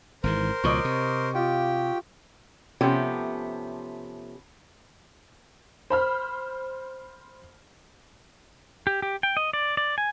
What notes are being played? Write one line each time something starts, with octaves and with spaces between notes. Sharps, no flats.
G#1 G#2 E3 A#4 C5
C#2 B2 F3 C#5 D#5 D6
C3
F4 G4 G5
C3 F3 A3 B3 C#4 G4
C5 B5 F6
G4
G4
G5
D#5
D5
D5
G#5